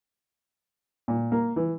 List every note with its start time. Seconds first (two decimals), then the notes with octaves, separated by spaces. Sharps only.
1.08 A#2
1.32 A#3
1.56 E3